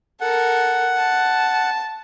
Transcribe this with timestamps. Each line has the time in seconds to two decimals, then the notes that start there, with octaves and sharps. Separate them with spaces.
0.21 A4 A#4 F#5
0.97 A5